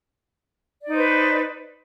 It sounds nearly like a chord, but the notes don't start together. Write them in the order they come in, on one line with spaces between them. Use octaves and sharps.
D5 D#4 C5 B4